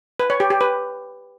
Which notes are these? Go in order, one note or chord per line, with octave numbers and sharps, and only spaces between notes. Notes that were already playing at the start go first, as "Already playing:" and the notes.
B4
C#5
G4
G4
B4